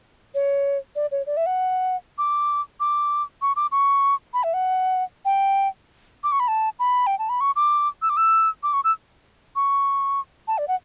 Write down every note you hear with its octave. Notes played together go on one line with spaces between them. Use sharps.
C#5
D5
C#5
D5
E5
F#5
D6
D6
C#6
D6
C#6
B5
E5
F#5
G5
D6
C#6
B5
A5
B5
G5
A5
B5
C#6
D6
E6
D6
E6
D6
C#6
E6
C#6
A5
D5
F#5